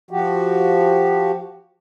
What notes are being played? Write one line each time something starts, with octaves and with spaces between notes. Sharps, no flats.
F3 F#4 G4